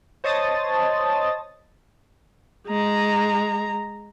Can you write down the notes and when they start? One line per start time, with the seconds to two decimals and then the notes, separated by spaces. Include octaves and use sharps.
0.24 C5 C#5 D#5 A5 D#6 A6
2.67 G#3 A#5